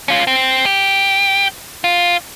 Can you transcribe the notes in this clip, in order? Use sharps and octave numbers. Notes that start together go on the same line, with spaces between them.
C#4 F4
C4
G4
F4